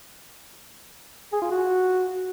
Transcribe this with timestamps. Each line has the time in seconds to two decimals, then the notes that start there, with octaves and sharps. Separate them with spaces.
1.33 G#4
1.42 F4
1.51 F#4